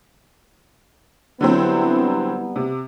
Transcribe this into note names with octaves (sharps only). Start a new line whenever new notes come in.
D3 F#3 G3 B3 C4 E4
C3